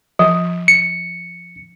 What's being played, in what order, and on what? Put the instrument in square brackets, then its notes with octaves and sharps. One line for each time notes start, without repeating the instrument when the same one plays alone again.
[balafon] F3
[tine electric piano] C#7